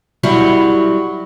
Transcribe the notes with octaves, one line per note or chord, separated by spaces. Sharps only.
F#3 G3 E4